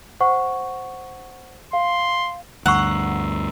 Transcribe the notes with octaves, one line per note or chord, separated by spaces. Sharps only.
C5 F#5 C#6
F5 C6
D2 G2 F#5 A#5 C#6 D#6 E6 C7